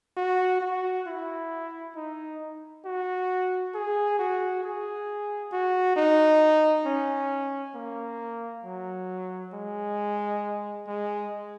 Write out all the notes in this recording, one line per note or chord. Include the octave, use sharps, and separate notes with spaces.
F#4
F#4
E4
D#4
F#4
G#4
F#4
G#4
F#4
D#4
C#4
A#3
F#3
G#3
G#3